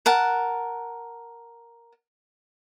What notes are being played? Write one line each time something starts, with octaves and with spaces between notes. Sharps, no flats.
A#4 F#5 A5